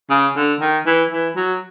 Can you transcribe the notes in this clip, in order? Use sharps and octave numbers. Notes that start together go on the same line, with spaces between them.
C#3
D3
D#3
E3
E3
F#3